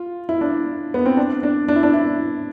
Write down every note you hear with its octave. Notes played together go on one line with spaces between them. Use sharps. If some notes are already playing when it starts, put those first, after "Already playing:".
Already playing: F4
E4
D4
B3
C4
D4
D4
D4
E4
D4
E4